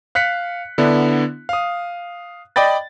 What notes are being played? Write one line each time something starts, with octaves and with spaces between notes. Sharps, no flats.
F5 F#6 B6 C#7
D3 B3 D4 E4
F5 D#6
D5 D#5 G5 B5 A6